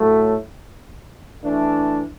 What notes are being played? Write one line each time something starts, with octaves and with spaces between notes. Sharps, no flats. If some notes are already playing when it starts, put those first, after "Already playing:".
Already playing: A2 F#3 A3
E3 A3 D4